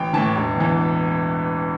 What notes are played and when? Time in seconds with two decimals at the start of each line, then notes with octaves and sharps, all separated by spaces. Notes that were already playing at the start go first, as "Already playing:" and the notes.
Already playing: A1 G5
0.13 A2 E3 A5
0.35 E1
0.56 E2 E3